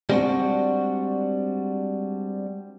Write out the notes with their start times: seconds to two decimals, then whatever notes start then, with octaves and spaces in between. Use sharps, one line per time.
0.10 G3 G#3 B3 C4 D4 F#4